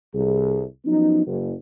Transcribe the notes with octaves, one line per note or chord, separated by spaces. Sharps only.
C2 G#4
F3 F#3 B3 C#4 D#4
F#1